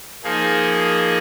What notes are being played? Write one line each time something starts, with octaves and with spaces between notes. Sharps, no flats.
F3 A#3 D#4 G#4